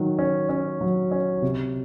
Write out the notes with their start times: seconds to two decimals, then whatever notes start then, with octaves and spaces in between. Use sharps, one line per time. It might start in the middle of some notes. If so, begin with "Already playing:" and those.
Already playing: D#3 F#3
0.19 C#4
0.49 C#4
0.81 F#3
1.12 C#4
1.42 C3